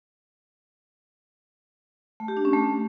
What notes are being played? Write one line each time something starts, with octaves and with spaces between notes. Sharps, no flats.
A3
G4
D4
C#4
A3